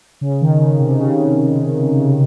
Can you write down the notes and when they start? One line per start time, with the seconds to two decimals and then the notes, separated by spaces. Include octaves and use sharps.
0.21 C#3
0.41 D#3
0.60 C#3
0.80 C3
1.00 C#3